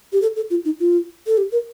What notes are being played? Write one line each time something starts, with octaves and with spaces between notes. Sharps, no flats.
G4
A4
A4
F4
D#4
F4
A4
G4
A#4